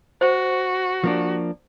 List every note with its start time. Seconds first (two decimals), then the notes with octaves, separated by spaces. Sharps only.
0.21 F#4 C5
1.04 F3 A#3 D4